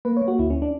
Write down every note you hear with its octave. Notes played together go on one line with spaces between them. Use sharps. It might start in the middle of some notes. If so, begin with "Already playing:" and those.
A#3 B4
C#5
A#3
F#4
D2 E4
C#4
D4